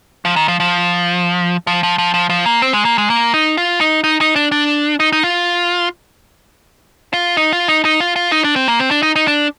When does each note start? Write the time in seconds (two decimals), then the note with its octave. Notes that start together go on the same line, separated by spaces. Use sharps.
0.25 F3
0.36 D#3
0.48 F3
0.60 F3
1.67 F3
1.83 F3
1.98 F3
2.14 F3
2.30 F3
2.46 A#3
2.62 C4
2.73 G#3
2.85 A#3
2.98 G#3
3.10 A#3
3.34 D#4
3.57 F4
3.81 D#4
4.04 D#4
4.21 D#4
4.36 D4
4.52 D4
5.00 D#4
5.13 D#4
5.23 F4
7.13 F4
7.37 D#4
7.53 F4
7.68 D#4
7.85 D#4
8.00 F4
8.16 F4
8.32 D#4
8.44 D4
8.56 C4
8.68 A#3
8.79 C4
8.91 D4
9.03 D#4
9.16 D#4
9.28 D4